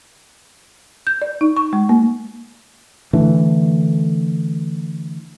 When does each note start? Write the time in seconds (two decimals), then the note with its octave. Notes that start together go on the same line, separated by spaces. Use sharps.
1.07 G6
1.22 D5
1.41 D#4
1.57 C#6
1.73 G#3
1.89 A#3
3.13 D3 E3 A3